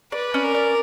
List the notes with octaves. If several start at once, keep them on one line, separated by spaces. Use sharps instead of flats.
B4 D5
C#4
A#4
D5